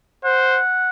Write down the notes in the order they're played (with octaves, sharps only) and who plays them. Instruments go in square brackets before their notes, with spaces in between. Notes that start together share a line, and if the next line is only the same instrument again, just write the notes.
[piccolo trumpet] C5 [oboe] F#5